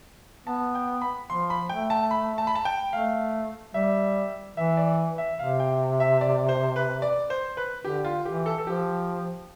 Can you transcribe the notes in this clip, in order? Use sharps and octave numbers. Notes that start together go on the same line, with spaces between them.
B3 A5
G5
B5
F3 C6
B5
A3 G5
A5
B5
A5
B5
A5
G5
A3 F5
G3 E5
E3 E5
D5
E5
C3 F5
G5
E5
D5
C5
B4
D5
C5
B4
D3 G4
F4
E3 G4
A4
A4
F3 G4